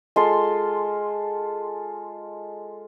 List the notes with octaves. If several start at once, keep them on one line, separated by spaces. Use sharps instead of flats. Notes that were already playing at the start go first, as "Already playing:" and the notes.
G#3 F4 A4 C6